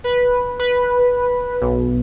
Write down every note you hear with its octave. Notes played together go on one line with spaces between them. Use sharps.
B4
B4
B1